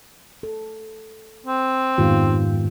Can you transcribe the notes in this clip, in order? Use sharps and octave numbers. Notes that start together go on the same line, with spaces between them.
A4
C4
F2 G#2 D#3 B3 F4 G4